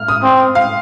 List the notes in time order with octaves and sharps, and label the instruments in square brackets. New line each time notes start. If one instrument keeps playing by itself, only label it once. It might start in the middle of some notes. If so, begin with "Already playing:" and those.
Already playing: [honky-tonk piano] F6
D#6
[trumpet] C4
[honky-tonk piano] F5